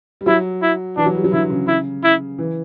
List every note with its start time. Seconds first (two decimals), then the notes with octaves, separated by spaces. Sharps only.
0.21 G3
0.26 F#3 E4
0.62 E4
0.97 E3 D4
1.06 F#3
1.15 G3
1.24 F#3
1.33 D3 E4
1.50 C#3
1.68 E4
2.04 E4
2.38 E3